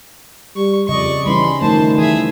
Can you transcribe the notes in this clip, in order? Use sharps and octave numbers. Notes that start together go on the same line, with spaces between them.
G3 C#6
F2 C#3 D5 D#5 C#6
E3 G3 C#4 D#4 B5 C6
D#3 F3 A3 C5 A5
E3 G#4 E5